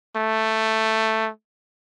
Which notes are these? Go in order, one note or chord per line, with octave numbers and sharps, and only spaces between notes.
A3